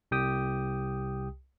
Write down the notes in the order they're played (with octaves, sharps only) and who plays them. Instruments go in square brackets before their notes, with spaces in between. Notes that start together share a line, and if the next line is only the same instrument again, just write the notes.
[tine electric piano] C2 G4 G5 D#6